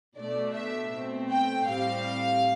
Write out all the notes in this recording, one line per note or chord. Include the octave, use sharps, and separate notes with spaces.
B2 A3 D4 D5
E5
B2 A3 C4
G5
A2 G3 C4 F5